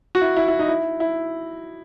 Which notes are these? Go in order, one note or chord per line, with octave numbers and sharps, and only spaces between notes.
F#4
E4
E4
E4
D#4
E4
E4